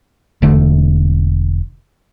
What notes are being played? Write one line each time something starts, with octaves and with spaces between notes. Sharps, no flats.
E1 D3 A3